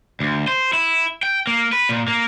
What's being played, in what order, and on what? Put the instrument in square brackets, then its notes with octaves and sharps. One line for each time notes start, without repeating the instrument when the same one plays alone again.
[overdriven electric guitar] D2
C5
E4
G5
A#3
B4
A#2
A#3